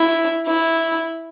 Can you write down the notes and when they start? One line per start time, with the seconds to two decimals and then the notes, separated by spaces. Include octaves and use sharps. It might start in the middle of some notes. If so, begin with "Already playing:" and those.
Already playing: E4
0.47 E4